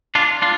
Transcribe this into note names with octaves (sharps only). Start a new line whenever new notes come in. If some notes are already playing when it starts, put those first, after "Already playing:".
D4 F4
D4 F4